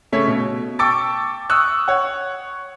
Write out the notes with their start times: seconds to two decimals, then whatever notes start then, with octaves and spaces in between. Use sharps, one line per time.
0.13 C#3 A3 C#5 B6
0.27 B2
0.79 G5 A5 C#6 D6 E6 A6
1.50 C#6 D#6 E6 F#6
1.88 C#5 F#5